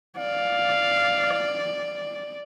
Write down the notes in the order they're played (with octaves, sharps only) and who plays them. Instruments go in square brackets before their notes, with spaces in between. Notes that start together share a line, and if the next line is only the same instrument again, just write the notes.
[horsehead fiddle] D5 [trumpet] F5